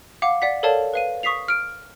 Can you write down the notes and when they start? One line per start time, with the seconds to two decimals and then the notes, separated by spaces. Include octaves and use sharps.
0.22 F5 F#5 D6
0.42 D5 F#5 B6
0.63 A4 A#4 C#5 D5 F5 A5
0.94 B4 F5 D#7
1.23 C#6 D#6 B6 C7 F7
1.48 F6 D7